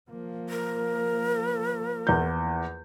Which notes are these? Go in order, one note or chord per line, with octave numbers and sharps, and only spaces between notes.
F3 A#3
A#4
E2 G6